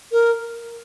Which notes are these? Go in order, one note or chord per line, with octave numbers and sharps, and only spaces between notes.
A#4